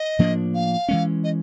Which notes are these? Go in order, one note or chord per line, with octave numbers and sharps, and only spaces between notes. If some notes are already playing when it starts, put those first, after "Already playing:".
Already playing: D#5
A2 F3 A#3 D4
F5
E3 G#3 C#4
D#5